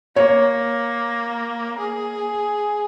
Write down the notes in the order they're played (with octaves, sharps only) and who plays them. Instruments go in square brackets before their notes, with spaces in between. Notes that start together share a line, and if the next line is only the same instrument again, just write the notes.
[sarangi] A#3 [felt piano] C#5
[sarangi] G#4